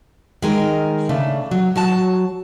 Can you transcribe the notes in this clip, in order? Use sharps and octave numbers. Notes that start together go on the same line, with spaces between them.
D#3 G#3 A#4
C#3 A3 D4
F#3
F#3 F#4 A5